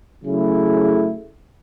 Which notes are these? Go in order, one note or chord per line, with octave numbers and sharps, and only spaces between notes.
C#3 F#3 A3 E4 G#4